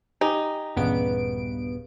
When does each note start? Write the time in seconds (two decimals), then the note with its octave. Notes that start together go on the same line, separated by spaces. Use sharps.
0.21 D#4 G4 G#5
0.76 D#1 G2 A#2 C#3 E3 B3 D7